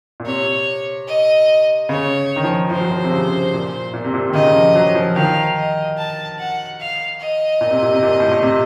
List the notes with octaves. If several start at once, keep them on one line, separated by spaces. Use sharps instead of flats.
A#2
C3 C#5
D#5
C#3 C#5
D#3
F3
F3 C5
F#3
F3
C3
C#3
A#2
A#2
C3
A#2
D#3
C#3 D#5
F3
F#3
F3
D#3 F5
D#5
A5
F#5
F5
D#5
A#2
C3
A#2
C3
A#2
A2
A#2
C3